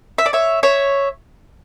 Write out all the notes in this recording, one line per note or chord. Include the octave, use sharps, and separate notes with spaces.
E5
D5
C#5 E5
C#5 E5